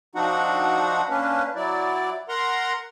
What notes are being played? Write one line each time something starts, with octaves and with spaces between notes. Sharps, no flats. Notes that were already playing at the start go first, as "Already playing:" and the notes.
F3 C4 D4 D#4 F#4 F#5
A#3 C#4 D4 B4
F#3 E4 D5
A#4 F#5 A#5 C6